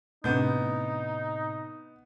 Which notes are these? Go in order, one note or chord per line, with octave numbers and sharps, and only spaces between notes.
A2 C3 A3 B3 C4 D4 D#4 G6